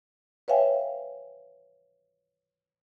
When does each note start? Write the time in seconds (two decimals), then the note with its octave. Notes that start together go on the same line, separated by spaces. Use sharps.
0.48 B4 C#5 E5 F5 G5 G#5